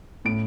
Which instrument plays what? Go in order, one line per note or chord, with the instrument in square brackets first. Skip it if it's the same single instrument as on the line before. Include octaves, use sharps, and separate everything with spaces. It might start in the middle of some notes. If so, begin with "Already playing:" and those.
[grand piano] A2 D7